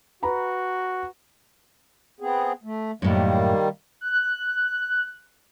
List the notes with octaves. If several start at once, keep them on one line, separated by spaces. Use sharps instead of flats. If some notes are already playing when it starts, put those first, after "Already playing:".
F#4 B4 A#5 B5
B3 C4 G#4
A3
F#2 A2 D#3 G3 A#3
F#6